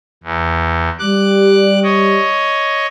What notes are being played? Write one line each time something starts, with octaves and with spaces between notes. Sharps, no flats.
E2
G3 D6 F#6
C#5 D#5